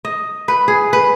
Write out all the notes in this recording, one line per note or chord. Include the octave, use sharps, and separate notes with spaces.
D#5
B4
G#4
B4